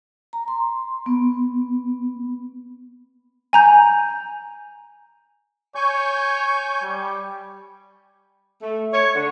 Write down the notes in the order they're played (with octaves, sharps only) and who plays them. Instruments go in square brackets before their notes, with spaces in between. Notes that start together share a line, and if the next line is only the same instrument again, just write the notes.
[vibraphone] A#5
C6
B3
[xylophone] G#5 A#5 G6
[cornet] C#5 [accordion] G#5 C#6 G6
[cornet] G3
[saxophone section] A3
C#5
D3